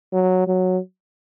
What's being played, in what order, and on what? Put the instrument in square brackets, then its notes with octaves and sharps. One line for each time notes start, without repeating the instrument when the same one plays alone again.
[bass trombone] F#3
F#3